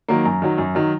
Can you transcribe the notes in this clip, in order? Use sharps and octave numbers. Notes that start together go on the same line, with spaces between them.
D#3 F#3 A#3
F#2 A#5
D#3 F#3
F#2
D#3 F#3